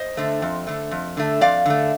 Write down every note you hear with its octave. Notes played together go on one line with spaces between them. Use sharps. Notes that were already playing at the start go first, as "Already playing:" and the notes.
Already playing: C5 D#5
D3 A3
F2
D3 A3
F2
D3 A3
F2 D5 F5
D3 A3